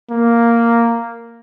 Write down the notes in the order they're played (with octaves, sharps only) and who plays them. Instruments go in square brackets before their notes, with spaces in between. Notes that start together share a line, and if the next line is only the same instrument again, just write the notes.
[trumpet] A#3